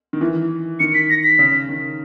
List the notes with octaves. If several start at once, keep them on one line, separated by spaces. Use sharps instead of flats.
D#3
E3
D#3 C#7
B6
A#6
B6
C#3
D#3